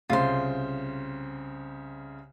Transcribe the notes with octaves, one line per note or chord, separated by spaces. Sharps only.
C2 C#3 F4 C5 C6